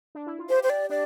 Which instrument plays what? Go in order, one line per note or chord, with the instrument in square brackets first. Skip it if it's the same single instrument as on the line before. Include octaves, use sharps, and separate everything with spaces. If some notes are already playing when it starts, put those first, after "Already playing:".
[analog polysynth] D4
E4
F4
[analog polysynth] G4 [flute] C5
[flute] C5
D5
[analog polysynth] D4 [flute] D5